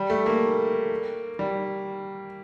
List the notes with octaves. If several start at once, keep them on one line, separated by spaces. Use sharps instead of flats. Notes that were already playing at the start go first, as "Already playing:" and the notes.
Already playing: G3
A3
A#3
G3